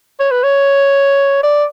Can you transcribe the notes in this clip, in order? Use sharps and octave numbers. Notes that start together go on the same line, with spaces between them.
C#5
B4
C#5
D5